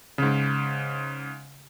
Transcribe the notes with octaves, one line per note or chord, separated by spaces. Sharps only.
G#2 C#3